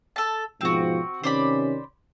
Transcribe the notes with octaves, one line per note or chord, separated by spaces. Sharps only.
A4 A5
G#2 B2 F3 C4 F#4
C3 D#3 C#4 C5 D5 B5